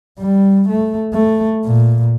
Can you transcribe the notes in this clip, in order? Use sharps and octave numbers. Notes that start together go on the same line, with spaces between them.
G3
A3
A3
A#2